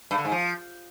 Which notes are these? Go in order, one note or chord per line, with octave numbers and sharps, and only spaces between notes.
G2
D3
G#2
F3